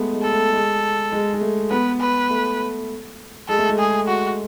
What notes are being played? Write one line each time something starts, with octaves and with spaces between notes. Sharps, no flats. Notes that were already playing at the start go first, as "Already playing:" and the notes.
Already playing: G#3 A3 B3
G#3
A4
A3
G#3
G#3
G#3
A3
B3 B4
B4
A3
G#3 A4
A3
G#3
G#4
F#4